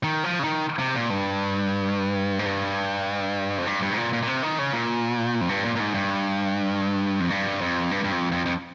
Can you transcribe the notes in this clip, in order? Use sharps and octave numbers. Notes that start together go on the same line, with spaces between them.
D#3
F3
C#3
D#3
C3
A#2
G2
G#2
G2
F2
G2
G2
G#2
A#2
A#2
A#2
C3
D#3
C#3
A#2
F2
G2
A#2
A#2
G#2
G2
F2
G2
F2
G2
G2
F2
F2
F2